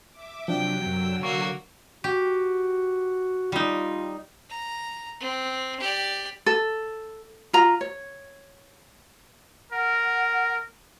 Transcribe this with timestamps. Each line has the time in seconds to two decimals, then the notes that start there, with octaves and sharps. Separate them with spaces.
0.11 E5 D6
0.48 C3 F3 F#3 D4 G5
0.86 F#2 D3 F#3 E6
1.23 A#3 F#4 C#6
2.04 F#4 G4
3.52 G3 D#4 F4
4.50 A#5
5.21 C4
5.80 G4 D5
6.46 A4
7.53 F4 A#5
7.81 C#5
9.72 A#4 F#5